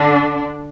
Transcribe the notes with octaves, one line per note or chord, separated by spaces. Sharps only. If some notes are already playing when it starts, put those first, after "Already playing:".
Already playing: D3 D4